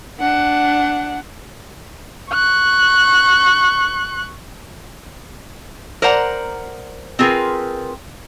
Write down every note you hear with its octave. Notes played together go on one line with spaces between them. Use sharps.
D4 F#5
C#6 F#6
A#4 C5 D5 F#5 A#5
C4 F4 G#4 A#4 B4